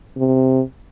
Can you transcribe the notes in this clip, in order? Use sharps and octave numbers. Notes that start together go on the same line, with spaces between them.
C3